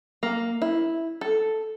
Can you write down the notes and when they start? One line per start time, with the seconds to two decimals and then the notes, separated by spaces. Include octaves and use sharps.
0.23 A#3
0.62 E4
1.21 A4